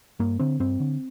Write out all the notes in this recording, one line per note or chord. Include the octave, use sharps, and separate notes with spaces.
G2 A#3
D3 C4
G2 C4
D3